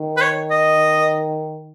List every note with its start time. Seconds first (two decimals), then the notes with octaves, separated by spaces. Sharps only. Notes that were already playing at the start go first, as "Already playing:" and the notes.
Already playing: D#3
0.17 B4
0.21 C#5
0.50 D#5